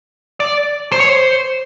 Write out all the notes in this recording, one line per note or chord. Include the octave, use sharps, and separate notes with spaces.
D5
C5
C#5
C5